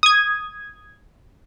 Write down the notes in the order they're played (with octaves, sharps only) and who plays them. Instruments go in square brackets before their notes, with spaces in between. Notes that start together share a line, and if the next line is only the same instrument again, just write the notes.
[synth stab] D#6 G#6